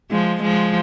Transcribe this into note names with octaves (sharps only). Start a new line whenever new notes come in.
F3 G#3
F3 G#3